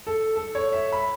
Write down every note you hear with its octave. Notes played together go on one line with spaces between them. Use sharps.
A4
A4
C#5
E5
B5